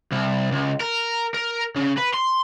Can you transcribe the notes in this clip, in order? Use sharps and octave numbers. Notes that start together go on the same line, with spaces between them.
C2
C#2
A#4
A#4
C#3
B4
C6